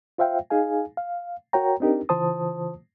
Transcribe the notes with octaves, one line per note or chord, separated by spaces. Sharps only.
F4 C5 E5 F5 G5
D#4 G#4 F5 G#5
F5
F#4 A#4 C#5 G5 A#5
C4 D4 D#4 G4 A#4
C#3 E3 F4 C5 A5 D#6